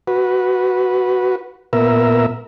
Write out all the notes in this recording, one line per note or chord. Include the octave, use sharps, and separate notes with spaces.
F#4 B4
A#2 B3 A#4 E5